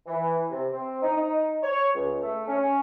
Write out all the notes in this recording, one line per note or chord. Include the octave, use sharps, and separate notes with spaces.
E3
C3
C4
D#4
D#4
C#5
C#2
A3
C#4